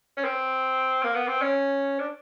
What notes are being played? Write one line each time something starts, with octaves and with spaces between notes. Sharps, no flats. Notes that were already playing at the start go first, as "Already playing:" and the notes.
C#4
C4
A#3
B3
C4
C#4
D4